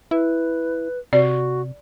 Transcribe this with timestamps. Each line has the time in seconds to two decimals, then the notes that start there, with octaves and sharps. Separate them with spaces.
0.11 E4 B4
1.13 C3 F#4 D5